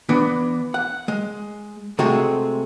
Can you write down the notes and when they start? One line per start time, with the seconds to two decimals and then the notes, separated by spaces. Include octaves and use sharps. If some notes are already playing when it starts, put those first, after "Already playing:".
0.09 E3 B3 D4
0.74 F#5
1.08 G#3
1.99 C3 G#3 A3 C4 F#4 G#4